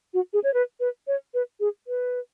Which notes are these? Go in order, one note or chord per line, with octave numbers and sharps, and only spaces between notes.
F#4
G#4
C#5
B4
B4
C#5
B4
G#4
B4